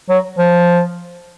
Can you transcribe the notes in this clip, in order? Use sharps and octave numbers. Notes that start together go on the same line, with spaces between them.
F#3
F3